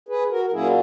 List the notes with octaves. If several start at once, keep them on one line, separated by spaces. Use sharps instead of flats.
G#4 B4
F#4 A#4
A#4
A#2 F#3 A#3 C#4 E4 G#4